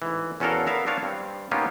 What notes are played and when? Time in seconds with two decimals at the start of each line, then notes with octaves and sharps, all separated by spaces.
0.02 A1 G#2 E3
0.40 E2 C#4 F#4 A4 A#4 F5
0.67 B3 A#4 E5 F5
0.86 C4 D4 F4 C#5 F5
1.02 G2 C4
1.51 A#3 B3 C#4 D#4 F4 G4